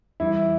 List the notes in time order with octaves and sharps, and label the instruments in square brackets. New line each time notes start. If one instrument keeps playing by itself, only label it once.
[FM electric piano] E2 E3 G3 [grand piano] E4